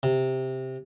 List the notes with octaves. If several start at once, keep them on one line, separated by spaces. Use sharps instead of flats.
C3